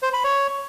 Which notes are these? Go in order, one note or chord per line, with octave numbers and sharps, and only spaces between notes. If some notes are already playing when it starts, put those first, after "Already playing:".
C5
B5
C#5